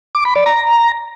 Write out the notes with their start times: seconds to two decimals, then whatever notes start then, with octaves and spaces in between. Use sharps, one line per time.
0.15 D6
0.25 B5
0.36 D5
0.46 A#5